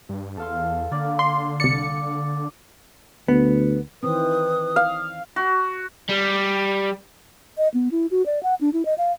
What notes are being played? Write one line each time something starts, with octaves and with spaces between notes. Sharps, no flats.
G2
E2 A4 F5 C6
D3 A#3 D5
C6
C2 D5 D6 C#7
D2 B3
D#3 E3 C4 B4 D#6
F5
F#4
G3
D#5
B3
E4
F#4
D5
F#5
D4
E4
D#5
F5